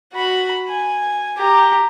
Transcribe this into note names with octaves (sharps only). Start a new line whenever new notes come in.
F#4 B5
G#5
G4 A#5